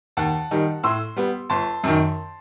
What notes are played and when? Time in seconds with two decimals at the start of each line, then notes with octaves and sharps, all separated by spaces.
0.17 D#2 F#5 A5
0.51 D#3 G3 D#4
0.83 A2 C6 E6
1.16 G3 B3
1.50 G1 A5 C6
1.84 F#2 D#3